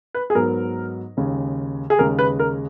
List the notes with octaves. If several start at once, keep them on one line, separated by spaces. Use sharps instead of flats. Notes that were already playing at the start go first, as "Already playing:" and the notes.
B4
G#4
G#2 F#3 B3 A#4
D#2 C#3 G#3
G#4
D#2 C#3 G#3 A#4
B4
A#4